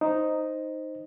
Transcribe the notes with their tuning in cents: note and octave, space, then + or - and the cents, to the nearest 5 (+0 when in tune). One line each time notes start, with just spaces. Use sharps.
D#4 +0 C5 +0